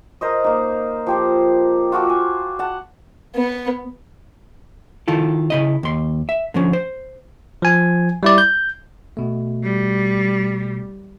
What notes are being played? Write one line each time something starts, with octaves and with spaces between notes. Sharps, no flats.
A#4 C5 D#5 D#6
A#3 D#4
F3 G4 C5
F4 F#4 A4 D6
G#5
F#5 A5
B3
D#3 E4 F4 A4
C#3 E4 D#5
D#2 C6
E5
D3 F3 C#4
C5
F3 G#5
G3 E4 D5
G6
B2 A3
G3